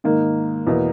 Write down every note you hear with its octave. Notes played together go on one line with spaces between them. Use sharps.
G#2 D#3 A#3
E2 B2 A#3